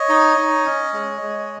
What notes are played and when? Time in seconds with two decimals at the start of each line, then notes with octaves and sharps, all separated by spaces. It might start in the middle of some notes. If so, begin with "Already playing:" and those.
Already playing: C#5 D#5
0.09 D#4
0.37 D#4
0.65 C#4
0.93 G#3
1.21 G#3